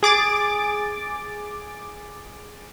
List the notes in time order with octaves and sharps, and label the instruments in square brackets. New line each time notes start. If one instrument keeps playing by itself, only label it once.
[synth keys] G#4 D6 A6